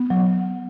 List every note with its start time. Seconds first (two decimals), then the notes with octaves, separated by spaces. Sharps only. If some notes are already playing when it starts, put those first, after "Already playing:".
Already playing: B3
0.10 F#3